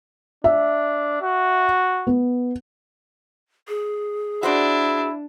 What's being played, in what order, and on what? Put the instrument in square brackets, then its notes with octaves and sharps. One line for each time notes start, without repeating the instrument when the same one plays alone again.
[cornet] D4 [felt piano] E5
[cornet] F#4
[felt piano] B3
[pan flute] G#4
[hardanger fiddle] D4 [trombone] E4 [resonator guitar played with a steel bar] F#4 C5 D5